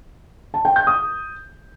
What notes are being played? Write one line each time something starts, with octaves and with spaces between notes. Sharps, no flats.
A5
G5
G6
D#6